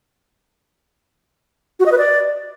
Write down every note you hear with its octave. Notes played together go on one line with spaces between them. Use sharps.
F#4
D#5
B4
D5